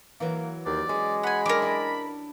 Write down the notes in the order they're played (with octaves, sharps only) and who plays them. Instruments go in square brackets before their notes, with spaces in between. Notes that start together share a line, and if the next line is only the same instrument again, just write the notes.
[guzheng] E3 F#3 [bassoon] A#3
[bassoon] D#2 [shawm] D5
[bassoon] G#3 [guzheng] C#4
[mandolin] F#5 G#5 [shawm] B5
[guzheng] F#3 D4 G4 [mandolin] A#4 D6
[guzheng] E4 D5 G#5